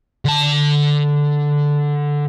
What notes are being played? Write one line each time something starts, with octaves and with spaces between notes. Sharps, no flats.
D3 A5